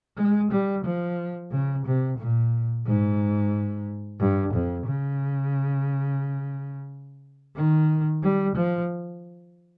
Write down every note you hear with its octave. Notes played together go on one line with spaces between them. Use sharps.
G#3
G3
F3
C#3
C3
A#2
G#2
G2
F2
C#3
D#3
G3
F3